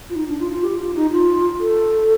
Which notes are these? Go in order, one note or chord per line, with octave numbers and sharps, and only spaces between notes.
F4
D#4
D4
F4
F4
G4
F4
D#4
F4
A4